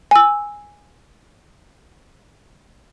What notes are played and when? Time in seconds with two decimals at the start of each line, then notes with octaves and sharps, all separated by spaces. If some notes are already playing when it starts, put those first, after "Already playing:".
0.11 G#5 E6